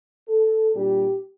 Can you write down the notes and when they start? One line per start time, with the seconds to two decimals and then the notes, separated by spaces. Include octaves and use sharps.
0.29 A4
0.74 A#2 G3 D4 G4